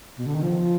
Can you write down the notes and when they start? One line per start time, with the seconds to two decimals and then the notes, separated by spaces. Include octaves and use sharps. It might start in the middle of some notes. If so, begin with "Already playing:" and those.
0.18 B2
0.26 D3
0.34 D#3
0.43 F3